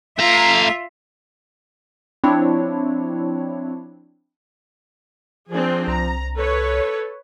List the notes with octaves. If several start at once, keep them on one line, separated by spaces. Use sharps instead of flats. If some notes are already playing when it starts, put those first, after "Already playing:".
A3 F4 E5 A#5
F3 C4 D4 E4 C#5
F3 C4 D4 G#4
C2 A#5
A4 B4 C#5